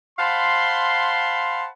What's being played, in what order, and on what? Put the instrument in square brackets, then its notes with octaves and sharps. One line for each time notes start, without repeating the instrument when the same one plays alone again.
[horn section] C5 F5 F#5 A5 B5 C6